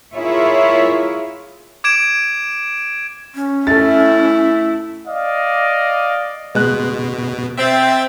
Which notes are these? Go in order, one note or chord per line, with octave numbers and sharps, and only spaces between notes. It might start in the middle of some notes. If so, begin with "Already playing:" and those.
E4 F4 G#4 A#4 C#5 E5
D6 G#6 D7 E7
C#4
A3 E4 A4 E5 A6
D5 D#5 F5
B2 G#3 F#6
C4 E5 G5 A6